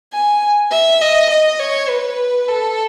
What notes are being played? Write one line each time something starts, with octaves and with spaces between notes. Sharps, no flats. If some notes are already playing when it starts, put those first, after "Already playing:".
G#5
E5
D#5
D#5
C#5
B4
A4